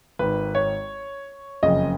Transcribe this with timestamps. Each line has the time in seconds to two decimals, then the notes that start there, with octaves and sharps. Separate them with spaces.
0.19 G#1 G#2 D#3 B4
0.55 C#5
1.63 F#1 F2 C#3 D#5